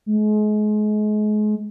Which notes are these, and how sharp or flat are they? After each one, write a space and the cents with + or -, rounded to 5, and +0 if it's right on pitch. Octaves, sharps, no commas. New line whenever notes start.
G#3 +35